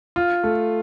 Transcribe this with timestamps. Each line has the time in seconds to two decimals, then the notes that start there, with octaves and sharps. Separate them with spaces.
0.16 F4
0.44 A3